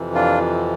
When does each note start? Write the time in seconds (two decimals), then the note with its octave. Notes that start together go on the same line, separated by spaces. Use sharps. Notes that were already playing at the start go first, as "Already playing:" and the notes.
Already playing: F2 C3 E3
0.15 D4 F4